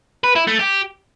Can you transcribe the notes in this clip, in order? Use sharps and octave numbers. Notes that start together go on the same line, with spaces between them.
B4
E4
A3
G4